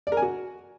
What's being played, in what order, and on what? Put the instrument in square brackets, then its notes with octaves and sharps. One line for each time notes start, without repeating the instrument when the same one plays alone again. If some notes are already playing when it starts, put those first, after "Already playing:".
[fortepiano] D5
A#4
G#5
F#4